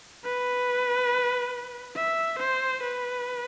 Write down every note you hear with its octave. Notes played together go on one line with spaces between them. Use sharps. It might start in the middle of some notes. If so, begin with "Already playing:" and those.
B4
E5
C5
B4